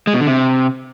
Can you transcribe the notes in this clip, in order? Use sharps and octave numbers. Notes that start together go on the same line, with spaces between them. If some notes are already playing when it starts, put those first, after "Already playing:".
G#3
B2
D3
C3